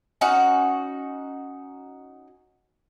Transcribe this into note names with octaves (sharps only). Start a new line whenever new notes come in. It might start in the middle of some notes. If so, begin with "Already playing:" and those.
C#4 D#4 F#4 F#5